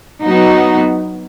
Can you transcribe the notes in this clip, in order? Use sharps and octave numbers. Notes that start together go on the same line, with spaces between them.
F#3 B3 D#4 F#4